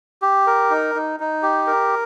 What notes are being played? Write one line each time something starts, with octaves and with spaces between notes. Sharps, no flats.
G4
A#4
D#4
D#4
D#4
G4
A#4